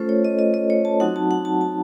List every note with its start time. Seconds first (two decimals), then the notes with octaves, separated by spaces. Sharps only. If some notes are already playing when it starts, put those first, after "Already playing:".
Already playing: A3 C#4 F4 A4 C5
0.09 C#5
0.25 D#5
0.39 D#5
0.54 D#5
0.70 C#5
0.85 A5
1.00 F#3 C4 D#4 F#4 F#5
1.16 A5
1.31 F#5
1.45 A5
1.61 A5